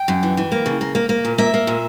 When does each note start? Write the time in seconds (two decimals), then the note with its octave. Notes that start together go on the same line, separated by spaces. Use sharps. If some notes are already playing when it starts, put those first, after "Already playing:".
Already playing: G5
0.08 F#2
0.23 E3
0.37 E3
0.52 A#3
0.66 C#3
0.81 A#3
0.95 A#3
1.09 A#3
1.25 A#2
1.38 A#3 E5
1.54 A#3
1.67 A#2